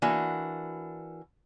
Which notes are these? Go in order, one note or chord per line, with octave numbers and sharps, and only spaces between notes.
E3 A#3 D4 F#4